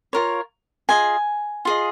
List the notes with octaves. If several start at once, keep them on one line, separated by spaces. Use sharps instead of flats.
F4 A#4 C#5
F4 G#4 D#5 G#5
F4 G#4 D#5